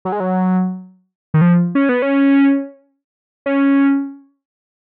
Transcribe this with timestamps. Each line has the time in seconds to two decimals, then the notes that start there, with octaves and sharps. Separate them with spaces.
0.05 F#3
0.12 G#3
0.20 F#3
1.34 D#3
1.41 F3
1.75 C#4
1.89 B3
2.02 C#4
3.46 C#4